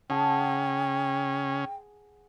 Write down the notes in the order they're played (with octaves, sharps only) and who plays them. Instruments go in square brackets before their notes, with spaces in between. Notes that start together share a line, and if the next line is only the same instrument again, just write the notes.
[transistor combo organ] C#3 C#4 [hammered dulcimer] G#4 F#5 A5 [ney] G5